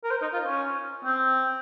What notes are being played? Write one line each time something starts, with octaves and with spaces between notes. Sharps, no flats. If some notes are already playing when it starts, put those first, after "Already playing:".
A#4
C5
D#4
F4
C#4
C4